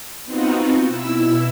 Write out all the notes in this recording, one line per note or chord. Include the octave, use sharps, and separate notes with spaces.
B3 C4 D#4 F4 F#4
B2 E4 E6